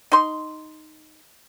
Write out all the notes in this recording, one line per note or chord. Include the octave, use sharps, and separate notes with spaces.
D#4 C6